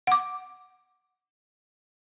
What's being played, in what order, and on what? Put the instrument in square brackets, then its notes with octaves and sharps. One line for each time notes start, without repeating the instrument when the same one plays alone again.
[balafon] F#5 D6